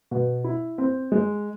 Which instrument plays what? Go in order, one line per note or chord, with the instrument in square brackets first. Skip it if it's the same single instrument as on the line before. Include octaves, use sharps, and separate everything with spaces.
[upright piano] B2
E4
C4
G#3